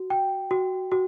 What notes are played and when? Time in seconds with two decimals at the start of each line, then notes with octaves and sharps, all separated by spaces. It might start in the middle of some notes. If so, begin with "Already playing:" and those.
Already playing: F#4
0.10 G5
0.51 F#4
0.92 F#4